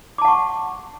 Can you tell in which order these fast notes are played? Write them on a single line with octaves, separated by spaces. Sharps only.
D6 A5 F#5 C#6